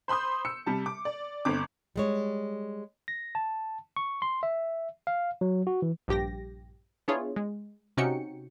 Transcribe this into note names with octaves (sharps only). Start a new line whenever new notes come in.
C5 B5 C6 D#6 G6
E6 C#7
C3 G3 A5
D6
D5
G1 C4 D6
G3 G#3 C#5
A#6
A5
C#6
C6
E5
F5
F#3
F#4
E3
A#1 G2 G4 G5 A#6
B3 D4 E4 F4 G#4 C#5
G#3
C3 C#4 D#4 F#4 G5 C#7